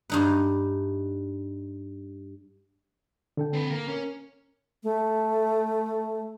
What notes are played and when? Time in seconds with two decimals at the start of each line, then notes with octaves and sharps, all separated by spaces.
0.10 G2 D#4 B4
3.37 D3 A4 G5
3.53 C4 B4
3.70 A#3
3.88 C#4 A#4
4.84 A3